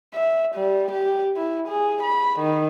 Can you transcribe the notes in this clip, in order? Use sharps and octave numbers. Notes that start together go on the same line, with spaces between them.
E5
G3
G4
E4
G#4
B5
D#3